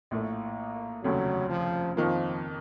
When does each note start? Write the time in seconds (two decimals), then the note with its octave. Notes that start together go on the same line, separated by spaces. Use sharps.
0.11 A#1 A2 A3 A#3
1.04 F1 D#2 C#3 F#3 A3
1.50 F3
1.97 F2 D#3 F3 A#3